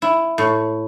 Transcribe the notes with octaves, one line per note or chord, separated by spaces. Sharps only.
E4
A2